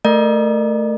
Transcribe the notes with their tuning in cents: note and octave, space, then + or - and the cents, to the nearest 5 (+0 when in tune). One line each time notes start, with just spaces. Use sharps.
A3 +0 A#4 -5 D5 +40